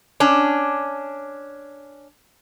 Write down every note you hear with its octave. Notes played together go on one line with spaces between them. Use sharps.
C#4 D4